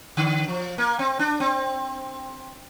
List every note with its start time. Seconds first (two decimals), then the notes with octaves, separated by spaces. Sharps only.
0.17 D3
0.48 F3
0.78 A#3
0.99 C4
1.19 D4
1.40 C4